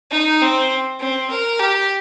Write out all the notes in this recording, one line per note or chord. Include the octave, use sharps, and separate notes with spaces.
D#4
C4
C4
A#4
G4